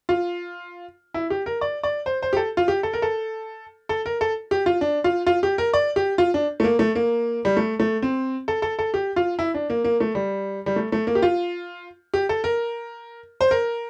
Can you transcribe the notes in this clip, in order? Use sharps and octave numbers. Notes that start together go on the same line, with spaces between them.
F4
E4
G4
A#4
D5
D5
C5
C5
G4
A4
F4
G4
A4
A#4
A4
A4
A#4
A4
G4
F4
D4
F4
F4
G4
A#4
D5
G4
F4
D4
A3
A#3
A3
A#3
G3
A3
A3
C4
A4
A4
A4
G4
F4
E4
D4
A#3
A#3
A3
G3
G3
A3
A3
A#3
G4
F4
G4
A4
A#4
C5
A#4